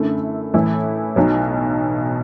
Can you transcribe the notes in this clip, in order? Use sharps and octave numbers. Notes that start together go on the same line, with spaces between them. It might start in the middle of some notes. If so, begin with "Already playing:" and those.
Already playing: F#2 D3 A3 E4
A2 E3 A3 E4
B1 B2 F#3